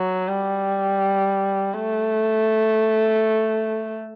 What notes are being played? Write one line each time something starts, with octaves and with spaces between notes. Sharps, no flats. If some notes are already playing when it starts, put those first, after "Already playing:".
Already playing: F#3
G3
A3